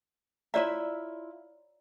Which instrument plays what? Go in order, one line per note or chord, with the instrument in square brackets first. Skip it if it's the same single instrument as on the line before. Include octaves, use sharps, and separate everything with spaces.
[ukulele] E4 F4 E5 [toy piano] C#5 D5 A#5